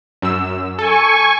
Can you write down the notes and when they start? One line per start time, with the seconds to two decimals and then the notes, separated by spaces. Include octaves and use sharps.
0.22 F#2 E6
0.79 A4 G#5 C#6